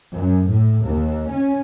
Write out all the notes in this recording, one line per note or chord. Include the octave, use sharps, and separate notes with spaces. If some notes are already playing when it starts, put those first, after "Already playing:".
F#2
A2
D#2
C#4